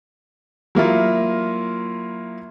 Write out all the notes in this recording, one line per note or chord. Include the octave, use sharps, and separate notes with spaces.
F#3 A#3 E4 F4